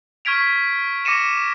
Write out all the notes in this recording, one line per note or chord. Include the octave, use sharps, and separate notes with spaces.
C#6 F6 G#6 B6 D7 F7
D6 A#6 C#7 D#7 E7